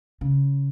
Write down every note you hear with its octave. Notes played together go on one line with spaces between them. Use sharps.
C#3